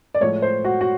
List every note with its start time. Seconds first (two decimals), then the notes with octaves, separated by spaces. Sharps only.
0.15 D5
0.20 A2 F3 G#3 C#5
0.42 C5
0.65 F#4
0.81 F#4